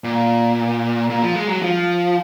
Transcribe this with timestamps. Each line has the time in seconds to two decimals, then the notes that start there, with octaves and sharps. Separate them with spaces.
0.04 A#2
1.10 A#2
1.22 F3
1.36 G#3
1.48 F#3
1.62 F3